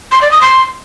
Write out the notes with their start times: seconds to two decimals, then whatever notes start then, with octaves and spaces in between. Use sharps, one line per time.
0.12 C6
0.22 D5
0.32 D#6
0.42 C6